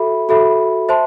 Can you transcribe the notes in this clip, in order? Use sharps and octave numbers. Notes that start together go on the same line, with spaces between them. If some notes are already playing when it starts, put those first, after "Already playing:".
Already playing: F#4 A4 E5 B5
F#4 A4 E5 B5
C5 E5 A5 C6